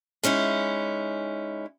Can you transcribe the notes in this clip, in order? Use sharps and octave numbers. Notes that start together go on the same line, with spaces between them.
G#3 C#4 D#4 E4